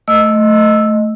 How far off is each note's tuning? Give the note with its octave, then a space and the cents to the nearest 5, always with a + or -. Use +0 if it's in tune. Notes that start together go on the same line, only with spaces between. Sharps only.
A3 -5 D#5 +0 E6 +0